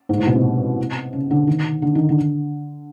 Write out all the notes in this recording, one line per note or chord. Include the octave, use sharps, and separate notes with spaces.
G#2
A2
B2
C3
C#3
D3
D#3
D3
D#3
D3